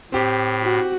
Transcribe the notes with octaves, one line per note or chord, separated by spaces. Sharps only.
A2 C4 G4
F#4